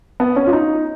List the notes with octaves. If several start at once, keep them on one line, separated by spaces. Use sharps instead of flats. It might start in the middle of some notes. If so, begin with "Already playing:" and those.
B3
C#4
F4
D#4